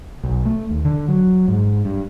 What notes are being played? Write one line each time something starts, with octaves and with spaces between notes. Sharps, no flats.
B1
A3
D#2
D3
F#3
G#2
G2